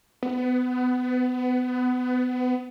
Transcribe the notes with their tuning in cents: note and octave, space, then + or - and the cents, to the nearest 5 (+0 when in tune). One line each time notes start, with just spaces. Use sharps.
B3 +25